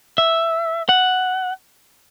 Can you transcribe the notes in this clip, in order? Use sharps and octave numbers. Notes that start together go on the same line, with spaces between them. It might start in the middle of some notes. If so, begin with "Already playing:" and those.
E5
F#5